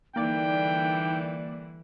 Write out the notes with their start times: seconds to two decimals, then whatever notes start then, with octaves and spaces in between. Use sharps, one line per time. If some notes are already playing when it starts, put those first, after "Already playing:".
0.16 D3 E3 G3 A#3 D#4 D5 G5